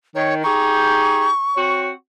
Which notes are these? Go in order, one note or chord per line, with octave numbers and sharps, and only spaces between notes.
D#3 C#5
D#4 G4 G#4 C#6
C4 F#4 C#5